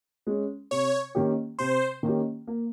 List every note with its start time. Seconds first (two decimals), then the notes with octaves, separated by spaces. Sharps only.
0.27 G#3 C#4
0.71 C3 C#5
1.15 D#3 A#3 C#4 G4
1.59 C3 C5
2.03 D#3 A#3 C#4 G4
2.47 A#3